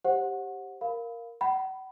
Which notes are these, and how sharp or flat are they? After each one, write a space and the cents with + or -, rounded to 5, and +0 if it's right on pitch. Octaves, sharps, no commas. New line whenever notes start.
G4 +0 C5 +35 F#5 -15
A#4 +0 F5 +0 B5 +10
F#5 +40 B5 +0